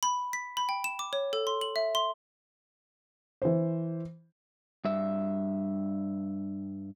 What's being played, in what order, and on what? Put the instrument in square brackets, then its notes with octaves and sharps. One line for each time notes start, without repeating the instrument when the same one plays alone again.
[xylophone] B5
B6
B5
G5
E7
D6
C#5
A4
C6
F#7
E5
C6
[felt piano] E3 C5
[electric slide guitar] G2 E5